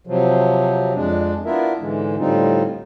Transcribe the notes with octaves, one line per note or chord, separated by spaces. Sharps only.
C3 F3 F#3
F2 G#3 D4
B3 D4 E4 F4 A#4 E5
G#2 D3 E3 G#3
A2 D3 G3 C4 D#4 F4